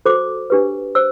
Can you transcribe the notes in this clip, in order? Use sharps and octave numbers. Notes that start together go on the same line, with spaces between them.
F#4 A4 C5 D6
D4 G4 B4
C5 E6